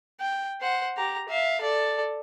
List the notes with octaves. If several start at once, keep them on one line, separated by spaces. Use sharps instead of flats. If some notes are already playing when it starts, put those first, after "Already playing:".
G5
C5 F#5
G4 A#5
E5 F5
A4 D5